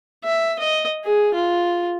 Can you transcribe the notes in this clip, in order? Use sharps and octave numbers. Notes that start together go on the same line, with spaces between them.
E5
D#5
G#4
F4